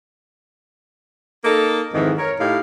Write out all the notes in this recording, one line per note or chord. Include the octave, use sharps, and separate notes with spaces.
A#3 D#4 A4
F2 G#2 D#3 E3
A#4 C#5
A2 D#4 G4 F5